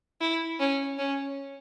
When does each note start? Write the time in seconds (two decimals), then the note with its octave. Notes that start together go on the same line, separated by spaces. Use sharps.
0.21 E4
0.60 C#4
0.99 C#4